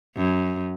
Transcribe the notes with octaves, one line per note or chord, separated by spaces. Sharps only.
F#2